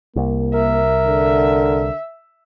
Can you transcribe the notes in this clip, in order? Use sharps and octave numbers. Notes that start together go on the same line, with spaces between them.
C2 A#3
A#4 E5
D3